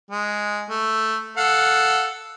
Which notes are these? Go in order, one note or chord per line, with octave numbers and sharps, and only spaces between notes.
G#3
A3
A4 F5 F#5